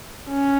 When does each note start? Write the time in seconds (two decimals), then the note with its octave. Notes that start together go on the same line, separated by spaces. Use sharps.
0.29 C#4